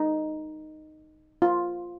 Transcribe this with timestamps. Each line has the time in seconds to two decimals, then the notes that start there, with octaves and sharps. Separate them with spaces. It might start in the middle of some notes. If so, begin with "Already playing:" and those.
Already playing: D#4
1.42 F4